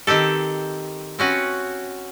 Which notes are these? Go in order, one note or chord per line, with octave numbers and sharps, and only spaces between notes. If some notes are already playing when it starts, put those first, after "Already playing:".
D#3 C4 G4 A4
C4 C#4 F#4 B4